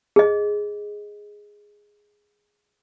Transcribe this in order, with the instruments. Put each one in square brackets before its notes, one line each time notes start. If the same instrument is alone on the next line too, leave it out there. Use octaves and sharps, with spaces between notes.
[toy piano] G#4 D#5